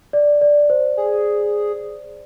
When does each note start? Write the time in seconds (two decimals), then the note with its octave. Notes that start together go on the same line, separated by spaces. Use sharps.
0.13 D5
0.41 D5
0.70 C5
0.97 G#4